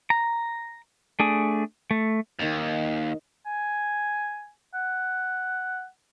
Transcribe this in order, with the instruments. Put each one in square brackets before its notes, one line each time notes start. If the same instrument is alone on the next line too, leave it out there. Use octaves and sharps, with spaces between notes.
[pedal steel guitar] A#5
A3 D4 G#4
A3
[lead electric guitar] D#2 [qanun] D#3 A#5
[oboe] G#5
F#5